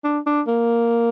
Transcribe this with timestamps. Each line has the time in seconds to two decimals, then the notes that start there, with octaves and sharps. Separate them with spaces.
0.04 D4
0.26 D4
0.47 A#3